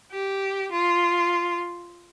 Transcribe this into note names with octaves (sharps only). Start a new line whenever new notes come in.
G4
F4